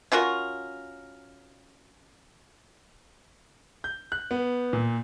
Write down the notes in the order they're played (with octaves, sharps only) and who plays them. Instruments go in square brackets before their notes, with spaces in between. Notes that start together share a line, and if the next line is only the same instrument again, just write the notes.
[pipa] C#4 F4 F#4 A#4
[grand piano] G6
F#6
B3
A#2